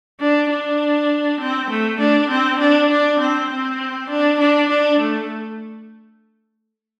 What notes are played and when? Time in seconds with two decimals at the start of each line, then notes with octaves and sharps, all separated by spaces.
0.20 D4
0.50 D4
1.40 C4
1.70 A3
2.00 D4
2.30 C4
2.60 D4
2.90 D4
3.19 C4
3.50 C4
4.10 D4
4.40 D4
4.69 D4
5.00 A3